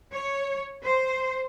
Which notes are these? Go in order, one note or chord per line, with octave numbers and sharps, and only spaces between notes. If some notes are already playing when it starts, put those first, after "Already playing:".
C#5
C5